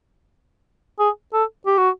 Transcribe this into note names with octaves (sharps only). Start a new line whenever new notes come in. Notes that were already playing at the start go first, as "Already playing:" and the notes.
G#4
A4
G4
F#4